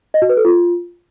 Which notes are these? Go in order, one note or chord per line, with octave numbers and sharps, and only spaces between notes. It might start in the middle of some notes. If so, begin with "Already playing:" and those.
D#5
F#4
B4
A4
F4